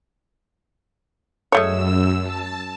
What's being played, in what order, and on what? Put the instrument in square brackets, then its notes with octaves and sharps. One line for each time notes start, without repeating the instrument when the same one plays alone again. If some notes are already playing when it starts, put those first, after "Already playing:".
[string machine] F#2 E6 [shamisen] G#3 A3 C#5
[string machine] A5